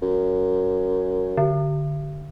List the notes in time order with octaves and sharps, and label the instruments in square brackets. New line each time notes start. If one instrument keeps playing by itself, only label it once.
[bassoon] F#2
[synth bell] D3